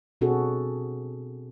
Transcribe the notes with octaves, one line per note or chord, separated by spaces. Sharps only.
B2 C4 D4 F#4 G#4 A4